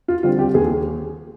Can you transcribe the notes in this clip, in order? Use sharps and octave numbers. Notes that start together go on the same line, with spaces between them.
F4
D3 G3 C4 F4
G4
D#2 G#4